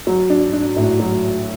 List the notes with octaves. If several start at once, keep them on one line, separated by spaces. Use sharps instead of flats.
F#3
D4
D4
A2
F#3